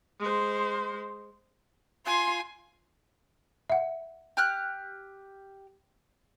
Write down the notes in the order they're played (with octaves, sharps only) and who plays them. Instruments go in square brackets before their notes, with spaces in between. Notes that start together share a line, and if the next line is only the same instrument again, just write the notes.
[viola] G#3 C5
[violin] F4 [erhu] G#5 [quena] C6
[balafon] E5 F#5
[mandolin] G4 F6 F#6